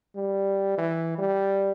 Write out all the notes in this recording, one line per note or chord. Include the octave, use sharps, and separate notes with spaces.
G3
E3
G3